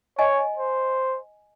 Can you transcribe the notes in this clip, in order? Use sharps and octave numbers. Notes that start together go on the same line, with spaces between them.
C#5 D#5 G#5
C5